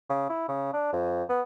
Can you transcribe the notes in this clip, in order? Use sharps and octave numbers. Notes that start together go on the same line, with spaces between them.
C#3
E4
C#3
D4
F2
B3